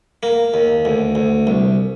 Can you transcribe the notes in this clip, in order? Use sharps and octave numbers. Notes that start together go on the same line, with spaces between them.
A#3
D#2
D2
D2
C2